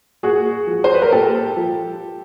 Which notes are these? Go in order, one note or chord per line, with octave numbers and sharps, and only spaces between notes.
A#2 F#4 G#4
F3
C5
B4
A#4
A#2 G4 A4
F3